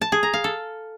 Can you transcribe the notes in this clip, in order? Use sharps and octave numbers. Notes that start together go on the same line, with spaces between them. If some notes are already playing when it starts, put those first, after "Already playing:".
A5
G#4
A#5
F5
A4